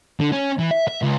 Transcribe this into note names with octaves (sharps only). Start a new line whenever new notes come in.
D3
C#4
E3
E5
E5
C#2